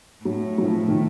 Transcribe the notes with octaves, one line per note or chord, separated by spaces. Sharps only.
A2 F#3
F#3
F3
D#3